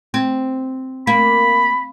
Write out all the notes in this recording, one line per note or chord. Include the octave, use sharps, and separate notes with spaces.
C4
A#3 B5